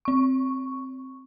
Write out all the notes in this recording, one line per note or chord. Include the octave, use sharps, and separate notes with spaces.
C4 C#6